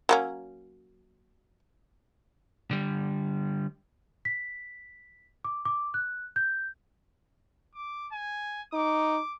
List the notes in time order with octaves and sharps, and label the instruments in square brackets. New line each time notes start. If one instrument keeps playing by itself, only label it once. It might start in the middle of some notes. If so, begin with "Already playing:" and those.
[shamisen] F#3 A#3 C#4
[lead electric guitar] D3 G3
[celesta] B6
D6
D6
F#6
G6
[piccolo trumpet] D6
G#5
[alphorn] D#4 [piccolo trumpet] D6